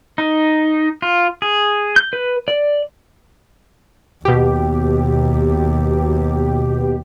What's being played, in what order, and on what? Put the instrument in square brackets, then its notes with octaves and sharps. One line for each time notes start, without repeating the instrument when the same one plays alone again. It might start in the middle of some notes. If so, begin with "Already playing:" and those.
[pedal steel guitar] D#4
F4
G#4
G6
B4
D5
[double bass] D#2 [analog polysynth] B2 G4